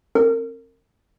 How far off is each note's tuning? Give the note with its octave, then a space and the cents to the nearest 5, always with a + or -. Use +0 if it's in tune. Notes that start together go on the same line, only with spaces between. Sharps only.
C4 +30 A#4 -30